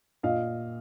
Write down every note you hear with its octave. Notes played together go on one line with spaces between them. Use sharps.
A#2 D#5 F5